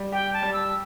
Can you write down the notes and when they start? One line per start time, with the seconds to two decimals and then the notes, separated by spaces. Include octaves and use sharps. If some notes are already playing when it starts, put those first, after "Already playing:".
Already playing: G3
0.12 G4 G5
0.34 A5
0.43 G3
0.53 E6